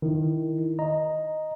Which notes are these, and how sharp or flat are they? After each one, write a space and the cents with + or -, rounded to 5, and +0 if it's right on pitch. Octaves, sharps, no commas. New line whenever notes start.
D#3 +0 E4 +0
D#5 +0 A#5 +0